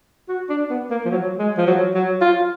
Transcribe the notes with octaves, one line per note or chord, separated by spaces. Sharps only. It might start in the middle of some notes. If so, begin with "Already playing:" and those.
F#4
D4
B3
A#3
F3
F#3
G#3
F3
F#3
F#3
F4